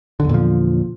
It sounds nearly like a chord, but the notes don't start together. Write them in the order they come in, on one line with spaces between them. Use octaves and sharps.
D3 E2 A#2 F3